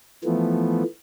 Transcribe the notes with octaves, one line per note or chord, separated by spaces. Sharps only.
E3 F3 A3 B3